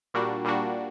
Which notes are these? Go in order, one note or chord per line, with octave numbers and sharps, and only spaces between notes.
A#2 G3 A#3 D4 F#4
A#2 G3 A#3 D4 F#4